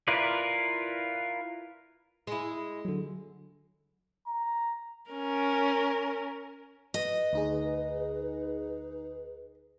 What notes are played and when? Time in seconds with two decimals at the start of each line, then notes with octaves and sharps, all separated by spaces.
0.08 E4 F4 A#4 B4 D5
2.27 G#3 E4
2.85 D3 F#3
4.27 A#5
5.11 C#4 A#4
6.94 B4 D#5
7.33 D2 D#4 G#4